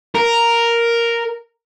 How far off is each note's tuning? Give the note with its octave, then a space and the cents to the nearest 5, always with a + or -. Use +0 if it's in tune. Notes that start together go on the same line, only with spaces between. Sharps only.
A#4 +0